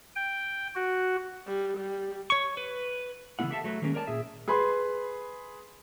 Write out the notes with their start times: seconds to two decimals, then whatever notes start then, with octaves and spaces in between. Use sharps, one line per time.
0.16 G5
0.75 F#4
1.47 G3
1.78 G3
2.30 C#5 C#6
2.57 B4
3.39 C#3 E3 G3 B3 E4 F#5
3.51 G4 A4 E5 F5 A5
3.64 F#3 A3 F#4 B4
3.82 D#3 F#3 G#3 A#3 C4 C#4
3.94 A#4 C#5 D5 G#5 A5
4.07 A#2 G#4 E5
4.48 G#4 B4 B5 C6